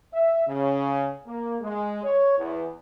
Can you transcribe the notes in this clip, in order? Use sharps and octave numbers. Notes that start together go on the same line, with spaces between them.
E5
C#3
A#3
G#3
C#5
E2